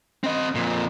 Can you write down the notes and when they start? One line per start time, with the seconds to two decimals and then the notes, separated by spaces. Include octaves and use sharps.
0.24 C4 D#5
0.55 F2 A#2